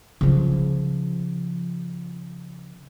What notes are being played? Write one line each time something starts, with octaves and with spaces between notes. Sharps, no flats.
C#3 F3